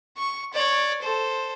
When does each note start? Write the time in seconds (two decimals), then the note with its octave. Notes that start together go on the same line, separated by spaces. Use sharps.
0.17 C#6
0.53 C#5 D5
1.01 A4 C5